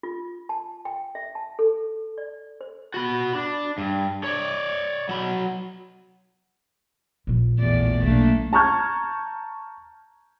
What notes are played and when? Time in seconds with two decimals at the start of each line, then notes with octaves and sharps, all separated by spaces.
0.03 F4
0.49 A5
0.85 G5
1.15 E5
1.35 A5
1.59 A4
2.18 D5
2.61 C5
2.94 F#4 B5
3.35 D4
3.78 G2
4.24 C#5 D5
5.09 F#3 B5
7.27 A#1 F3
7.60 E2 A2 D5
8.03 B1 A3 A#3 D4
8.53 A5 A#5 C#6 F6 G6 G#6